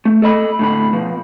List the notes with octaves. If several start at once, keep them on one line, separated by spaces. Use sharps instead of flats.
A3
A4 D#5 B5
A2 D3 B5
B2 F3